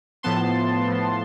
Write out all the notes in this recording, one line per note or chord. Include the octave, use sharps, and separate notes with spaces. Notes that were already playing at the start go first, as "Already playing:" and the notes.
A2 F3 B3 A5 C6
A2 F3 B3